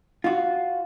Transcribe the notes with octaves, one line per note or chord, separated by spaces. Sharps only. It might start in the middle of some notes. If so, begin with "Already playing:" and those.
F4 F#4